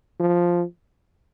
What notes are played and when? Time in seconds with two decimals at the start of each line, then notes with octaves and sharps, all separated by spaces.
0.20 F3